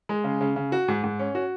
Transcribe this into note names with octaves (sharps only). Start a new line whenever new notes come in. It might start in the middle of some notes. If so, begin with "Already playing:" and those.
G#3
C#3
C#3
C#3
F#4
G#2
G#2
C#4
F#4